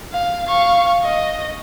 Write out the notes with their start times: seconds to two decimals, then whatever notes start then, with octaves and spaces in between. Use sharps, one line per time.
0.13 F5
0.47 F5 C#6
1.04 D#5